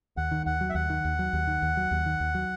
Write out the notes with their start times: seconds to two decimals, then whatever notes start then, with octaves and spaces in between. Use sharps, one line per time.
0.17 D#2 F#5
0.31 D#3
0.46 D#2 F#5
0.61 F#3
0.70 E5
0.75 D#2 F#5
0.90 D#3
1.05 D#2
1.19 F#3
1.33 D#2
1.47 D#3
1.62 D#2
1.77 F#3
1.91 D#2
2.06 D#3
2.20 D#2
2.35 F#3